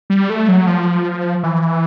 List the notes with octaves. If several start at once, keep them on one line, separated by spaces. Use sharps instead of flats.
G3
A3
F#3
F3
E3